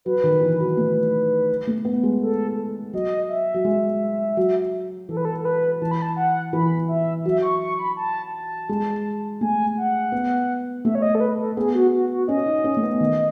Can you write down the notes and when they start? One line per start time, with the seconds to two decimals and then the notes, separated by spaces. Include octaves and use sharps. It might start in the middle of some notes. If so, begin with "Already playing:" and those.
0.05 F#3 B4
0.24 D#3
0.41 E3
0.60 F#3
0.77 A3
1.67 A3
1.85 B3
2.03 G#3
2.22 A4
2.93 F#3 D#5
3.29 E5
3.54 F#3
3.65 G#3
4.37 F#3
5.09 E3 A4
5.17 B4
5.25 A4
5.38 A4
5.45 B4
5.81 E3 A5
5.91 B5
6.02 A5
6.17 F#5
6.53 E3 B5
6.88 E5
7.25 F#3 E5
7.42 C#6
7.61 C#6
7.79 B5
7.97 A5
8.33 A5
8.69 G#3
9.41 A3 G#5
9.77 F#5
10.12 B3
10.84 A3 E5
10.95 C#5
11.02 D#5
11.15 A4
11.20 B4
11.39 A4
11.56 B3 G#4
11.74 F#4
11.92 F#4
12.10 F#4
12.28 C#4 D#5
12.46 D#4
12.64 C#4
12.77 A3
12.83 B3
13.00 D#3